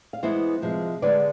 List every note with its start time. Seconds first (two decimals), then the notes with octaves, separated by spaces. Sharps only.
0.13 F5
0.23 E3 G#3 B3 E4 C5 E5
0.62 C3 F3 G#3
1.02 D3 G#3 B3 B4 D5